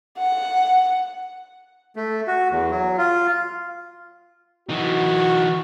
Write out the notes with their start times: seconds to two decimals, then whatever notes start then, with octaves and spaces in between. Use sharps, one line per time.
0.19 F#5
1.96 A3
2.27 F#4
2.51 E2
2.71 F#3
2.98 F4
4.69 E3 D#4 F#4